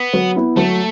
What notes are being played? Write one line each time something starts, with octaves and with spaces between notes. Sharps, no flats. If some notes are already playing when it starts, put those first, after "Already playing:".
Already playing: B3
F#3
B3 E4
F#3 A3